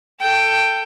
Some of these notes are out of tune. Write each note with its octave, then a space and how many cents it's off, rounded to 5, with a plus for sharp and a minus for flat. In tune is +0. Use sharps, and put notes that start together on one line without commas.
A4 +20 G5 +0